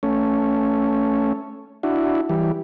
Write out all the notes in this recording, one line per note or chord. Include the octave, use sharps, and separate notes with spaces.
A3 C#4
D4 E4 F#4
E3 G3